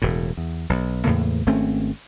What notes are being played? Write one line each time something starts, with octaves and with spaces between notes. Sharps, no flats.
E1 A2
E2
B1
E2 A2 C#3 A#3
G#1 A3 C4 C#4